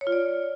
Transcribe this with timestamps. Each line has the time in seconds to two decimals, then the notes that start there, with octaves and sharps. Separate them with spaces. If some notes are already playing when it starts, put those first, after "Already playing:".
0.01 C#5
0.07 F4
0.12 D5